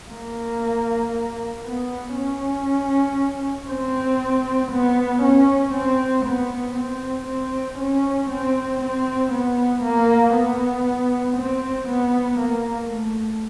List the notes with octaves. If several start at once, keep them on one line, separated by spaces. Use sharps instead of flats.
A#3
B3
C#4
C4
B3
C#4
C4
B3
C4
C4
C#4
C4
C4
B3
A#3
B3
C4
B3
A#3
A3